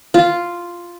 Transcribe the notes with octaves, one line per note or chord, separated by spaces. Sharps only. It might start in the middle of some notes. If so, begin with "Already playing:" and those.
F4